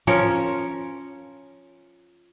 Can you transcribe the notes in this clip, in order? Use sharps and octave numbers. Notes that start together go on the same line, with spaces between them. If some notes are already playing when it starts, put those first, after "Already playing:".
F3 C#4 A#4 C#5